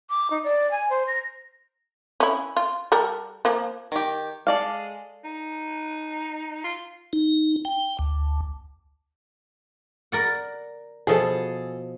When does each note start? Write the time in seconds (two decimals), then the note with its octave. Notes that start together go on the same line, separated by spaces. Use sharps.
0.10 D6
0.30 D#4
0.44 D5
0.71 G#5
0.90 C5
1.07 A#6
2.20 C#4 E4
2.57 F4
2.92 G3 A4 A#4
3.45 F3 A#3
3.92 D#3 G4
4.47 G#3 A4 D5 F5
5.24 D#4
6.64 F4
7.13 D#4
7.65 G5
7.99 D2
10.12 A#4 D5 F#5
11.07 B2 F3 G#4 A4